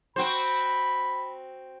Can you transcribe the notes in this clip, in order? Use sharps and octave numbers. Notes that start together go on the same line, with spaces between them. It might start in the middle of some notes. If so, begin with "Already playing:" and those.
C4 F#4 C5 B5